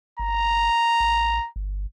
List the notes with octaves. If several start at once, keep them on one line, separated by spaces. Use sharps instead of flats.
G1 A#5
A1
G1